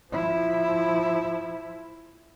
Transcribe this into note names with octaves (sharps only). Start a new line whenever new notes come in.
F3 E4